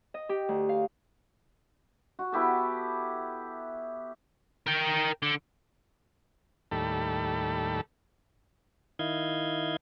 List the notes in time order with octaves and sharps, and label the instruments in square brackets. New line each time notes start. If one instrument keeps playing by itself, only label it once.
[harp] D#5
G4
D2
F5
[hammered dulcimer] F#4
B3 E4 G4 A4
[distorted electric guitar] A#4 G5
D3
[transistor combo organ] D#2 A2 G3 A4 B5
[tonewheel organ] D#3 E4 D#5 F5 G6 G#6